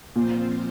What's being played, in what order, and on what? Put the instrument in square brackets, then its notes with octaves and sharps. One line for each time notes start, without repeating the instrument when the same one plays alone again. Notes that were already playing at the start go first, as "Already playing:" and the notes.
[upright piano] A#2 [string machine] F3 C4 F4 C5